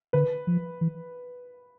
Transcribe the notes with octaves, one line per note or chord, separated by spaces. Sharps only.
D3 B4
F3
E3